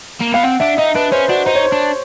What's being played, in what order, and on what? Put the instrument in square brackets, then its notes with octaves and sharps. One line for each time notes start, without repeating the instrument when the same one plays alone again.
[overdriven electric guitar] A#3
[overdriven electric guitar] B3 [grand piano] F5
[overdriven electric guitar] C4 [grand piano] F#5
[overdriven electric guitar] D4 [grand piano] E5
[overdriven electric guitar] D#4 [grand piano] D#5
[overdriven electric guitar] D4 [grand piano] B4
[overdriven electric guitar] C#4 [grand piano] C5
[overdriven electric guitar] D4 [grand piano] F#4
[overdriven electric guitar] D#4 [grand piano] C5
[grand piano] C#5
C5
[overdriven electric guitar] D4